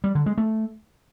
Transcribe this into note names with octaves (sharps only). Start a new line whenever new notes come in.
G3
D3
G#3
A3